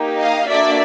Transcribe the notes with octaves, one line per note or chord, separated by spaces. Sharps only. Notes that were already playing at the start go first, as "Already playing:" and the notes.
Already playing: A#3 D#4 G4
D#5 F5
A#3 D4 F#4 A4 D5 E5